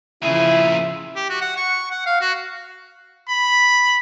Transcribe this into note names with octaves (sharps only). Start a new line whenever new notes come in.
A#2 C#3 F3 E4 G#4 E5
G4
F#4
F#5
C#6
F#5
F5
F#4
B5